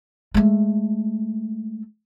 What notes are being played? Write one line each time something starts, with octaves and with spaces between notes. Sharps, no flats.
G#3 A3